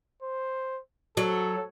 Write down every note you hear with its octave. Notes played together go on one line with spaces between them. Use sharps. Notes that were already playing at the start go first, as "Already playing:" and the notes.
C5
F#3 A4